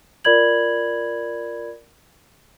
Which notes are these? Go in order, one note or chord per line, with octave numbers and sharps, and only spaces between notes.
F4 A#4 D5 B5 G#6 F#7